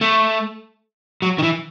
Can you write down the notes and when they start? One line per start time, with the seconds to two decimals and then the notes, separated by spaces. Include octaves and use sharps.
0.01 A3
1.22 F#3
1.38 D#3
1.43 E3